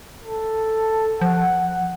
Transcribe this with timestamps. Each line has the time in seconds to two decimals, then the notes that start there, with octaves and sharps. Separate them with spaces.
0.23 A4
1.21 F3 F#5